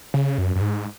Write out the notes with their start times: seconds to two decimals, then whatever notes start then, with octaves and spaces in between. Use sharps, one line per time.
0.14 C#3
0.38 F#2
0.56 F#2
0.61 G#2